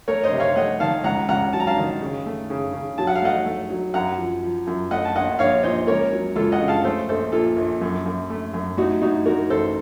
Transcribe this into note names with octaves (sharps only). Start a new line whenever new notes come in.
A3 A#4 C#5
C5 D#5
C3
C#5 F5
A3 D#5 F#5
D#3 F5 A5
C#2 F#5 A#5
C#2 F#5 A#5
F#3 A5
A#5
F5 A5
D#3
C#3
A3
C#3
C#3
F#3 A5
F#5
F5
A3 D#5 F#5
A3
F#3
F#2 F#5 A#5
F3
F3
F#2
A3 D#5 F#5
A5
A#1 D#5 F#5
A#1 C#5 F5
A#2 C5 D#5
C#2 A#4 C#5
F#3
C#2 F4 A4
D#5 F#5
C#3
F5 A5
A3 A4 C5
A#1 A4 C5
A#2 F4 A4
A#1
F#2
F#2
A3
F#2
A2 D#4 F#4
A2 D#4 F#4
A2 F#4 A#4
A1 A4 C5